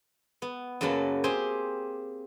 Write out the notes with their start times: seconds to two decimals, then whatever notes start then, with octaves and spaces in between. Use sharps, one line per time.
0.42 B3
0.81 F#2 C#3 F#3 A#3 B4 A5
1.24 C4 G4 G#4 C5 G#5 C6